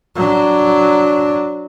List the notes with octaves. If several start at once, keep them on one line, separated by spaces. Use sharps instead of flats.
F#3 D4